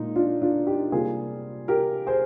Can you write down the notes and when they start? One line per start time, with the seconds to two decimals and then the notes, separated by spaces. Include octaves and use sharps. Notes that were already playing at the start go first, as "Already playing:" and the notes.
Already playing: A#2 G#3 D#4
0.16 D4 F4
0.42 D4 F4
0.67 D#4 G4
0.92 C3 G3 A#3 F4 G#4
1.68 G4 A#4
2.07 G#4 C5